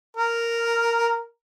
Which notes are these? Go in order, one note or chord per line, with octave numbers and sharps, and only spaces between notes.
A#4